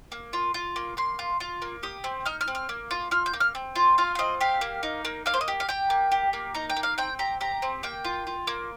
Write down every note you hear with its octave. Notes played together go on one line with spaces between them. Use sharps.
A#3
F4
F4
A#3
A#3 C6
F4
F4
A#3
G4 D#6
C4
D#4 F6
F6
C4
F6
A#3
F4
F4 F6
G6
A#3
F6
C4
F4
F4 F5
F5
C4 D#5
G4 F5
A#3
D#4
A#3
A#3 F5
C5
D#5
G4
F5
G4 G5
A#3
G4
A#3
D#4 A#5
G5
A#3
F5
C4 G5
G4 A#5
G4 A#5
C4
A#3 G5
F4
F4
A#3